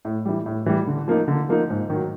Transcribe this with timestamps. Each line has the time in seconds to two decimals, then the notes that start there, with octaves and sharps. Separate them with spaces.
0.05 A2
0.25 E3 G3
0.46 A2
0.66 E3 G3
0.87 D3
1.08 F3 A#3 D#4
1.28 D3
1.49 F3 A#3 D#4
1.70 G#2
1.90 D#3 F#3